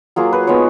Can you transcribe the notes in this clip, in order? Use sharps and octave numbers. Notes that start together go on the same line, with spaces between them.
F#3 A#3 F4 G#4
B4
G#3 B3 D#4 C#5